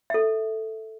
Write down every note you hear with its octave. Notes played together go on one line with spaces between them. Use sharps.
A4 E5